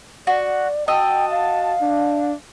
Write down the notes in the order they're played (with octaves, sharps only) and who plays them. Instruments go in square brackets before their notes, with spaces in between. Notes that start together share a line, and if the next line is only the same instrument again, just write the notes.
[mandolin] F#4 [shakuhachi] D5
[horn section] F#4 F#5 A5 [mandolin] D#5 E6 [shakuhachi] G5
[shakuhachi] F5
[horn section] D4